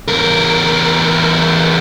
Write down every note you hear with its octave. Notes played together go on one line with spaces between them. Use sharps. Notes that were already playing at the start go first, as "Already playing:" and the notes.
E2 A#4